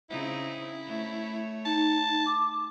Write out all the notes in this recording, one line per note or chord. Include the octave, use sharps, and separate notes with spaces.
C#3 C4 D#4 E4
A3 C#5
D#4 A5
D6